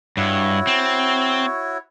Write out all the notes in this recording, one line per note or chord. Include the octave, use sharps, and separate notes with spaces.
G2 E4 F#4 C#5
C4